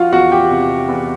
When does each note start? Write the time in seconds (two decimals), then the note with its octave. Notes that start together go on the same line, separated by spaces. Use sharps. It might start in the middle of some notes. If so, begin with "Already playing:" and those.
Already playing: F3 F4 F#4 F5 F#5
0.12 E2 F#4 F#5
0.31 G4 G5
0.50 C3
0.88 E2